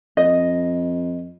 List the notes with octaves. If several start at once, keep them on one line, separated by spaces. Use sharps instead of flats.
F2 D#5